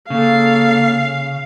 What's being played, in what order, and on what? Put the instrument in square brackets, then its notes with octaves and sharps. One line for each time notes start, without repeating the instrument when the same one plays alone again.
[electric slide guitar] C#3 [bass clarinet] A#3 [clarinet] A4 [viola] F5